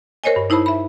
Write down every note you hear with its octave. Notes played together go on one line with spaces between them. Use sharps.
A#4 C5 C#5 D#5 G#5
G2
D#4 E4 C5 A5 B5
E5 B5